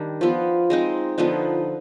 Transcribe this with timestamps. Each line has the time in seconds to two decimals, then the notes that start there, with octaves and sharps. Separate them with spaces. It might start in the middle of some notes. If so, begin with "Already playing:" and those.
Already playing: D#3 G3 D4
0.21 F3 B3 F4
0.70 G#3 C4 D#4
1.18 D3 F3 B3 D#4